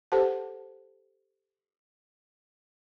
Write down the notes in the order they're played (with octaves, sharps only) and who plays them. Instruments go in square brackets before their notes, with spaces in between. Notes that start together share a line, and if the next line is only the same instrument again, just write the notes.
[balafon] G4 A4 C5 F#5 A5